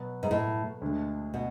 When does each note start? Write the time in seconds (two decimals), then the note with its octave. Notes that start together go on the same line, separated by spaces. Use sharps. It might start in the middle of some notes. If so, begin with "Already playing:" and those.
Already playing: B2 F#3 B3
0.23 G#2
0.31 A2
0.81 D2 D3 G#3
1.34 B2